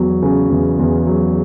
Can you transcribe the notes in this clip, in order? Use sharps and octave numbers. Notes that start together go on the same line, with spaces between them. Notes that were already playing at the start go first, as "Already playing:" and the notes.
Already playing: E2 F#3
C#3
E2
E2
F#3